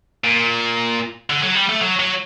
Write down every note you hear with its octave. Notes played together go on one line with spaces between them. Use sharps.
A#2
D3
F#3
G3
A3
F#3
F#3